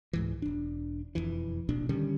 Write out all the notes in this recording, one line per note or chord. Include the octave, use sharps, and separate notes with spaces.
C#2 G#2 E3
E1 D4
E1 C2 F2 E3
D1 A#1 B2 D4
D3 D#3 G3 C#4